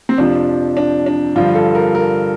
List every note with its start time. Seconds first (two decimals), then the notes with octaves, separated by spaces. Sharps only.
0.09 C4
0.18 F2 C3 F3 D4
0.77 D4
1.06 D4
1.36 G2 D3 F3 F4
1.55 A4
1.75 A#4
1.95 A#4